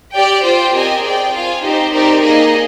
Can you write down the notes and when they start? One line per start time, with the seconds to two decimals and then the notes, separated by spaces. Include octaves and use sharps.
0.13 G4 D5 G5
0.43 F4 C5 G5
0.74 C4 G4 A#4 D#5 G#5
1.03 G#4 D5 G5
1.33 F4 C5 F5 G#5
1.62 C4 D#4 G4 C5 D#5
1.93 C4 D#4 G4 A#4 D5
2.23 A#3 D#4 G#4 D#5